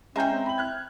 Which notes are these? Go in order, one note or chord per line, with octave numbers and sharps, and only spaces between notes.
G#3 C#4 E5 G5 A#5 G6
C4
B5 F#7
F6 F#6 G#6